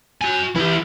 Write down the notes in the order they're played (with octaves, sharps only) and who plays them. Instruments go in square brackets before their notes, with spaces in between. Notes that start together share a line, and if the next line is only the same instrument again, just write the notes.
[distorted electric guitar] F#4 G#5
[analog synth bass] E3 [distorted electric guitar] E4 G4